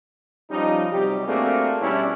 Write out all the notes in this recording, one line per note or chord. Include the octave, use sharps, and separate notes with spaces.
F3 G3 C#4 D#4
C3 F#3 G3 G4
A3 A#3 C4 D4 F#4 G#4
B2 G3 C#4 D4 E4